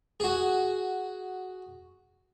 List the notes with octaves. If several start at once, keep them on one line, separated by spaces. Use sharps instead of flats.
F#4 G#4